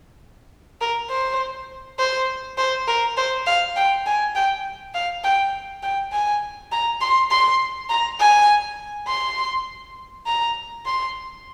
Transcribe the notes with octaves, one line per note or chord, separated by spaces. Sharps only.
A#4
C5
C5
C5
A#4
C5
F5
G5
G#5
G5
F5
G5
G5
G#5
A#5
C6
C6
A#5
G#5
C6
A#5
C6